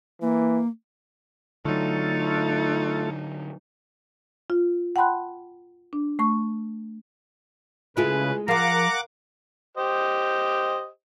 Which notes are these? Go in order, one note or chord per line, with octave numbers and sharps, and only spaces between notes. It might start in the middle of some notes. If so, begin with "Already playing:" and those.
E3 A#3
D3 F#3 A3 D#4 F4 A4
F4
F#5 G5 A5 B5 C6 F#6
D4
A3 C#6
C#3 G#3 A3 E4 F4 G#4 B4
F3 G#4 A#4 F5 F#5 A#5 D6 C7
G4 C5 D#5